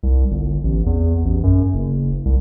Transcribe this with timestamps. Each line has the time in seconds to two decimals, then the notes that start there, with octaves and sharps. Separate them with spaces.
0.03 C2
0.31 G1
0.64 A1
0.86 E2
1.25 A1
1.43 F#2
1.74 F#1
2.25 C2